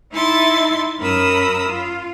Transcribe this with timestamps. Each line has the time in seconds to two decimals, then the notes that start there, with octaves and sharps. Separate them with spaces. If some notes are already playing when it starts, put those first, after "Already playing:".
0.12 D#4 E4 E5 C6 A6
1.00 F#2 A#4 B5 D#6 E6
1.68 F4